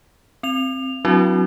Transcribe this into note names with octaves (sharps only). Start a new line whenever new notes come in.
C4 F7
F#3 C4 D4 E4 F#4